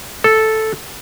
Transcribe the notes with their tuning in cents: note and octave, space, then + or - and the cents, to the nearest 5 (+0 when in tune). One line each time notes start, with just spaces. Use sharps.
A4 -5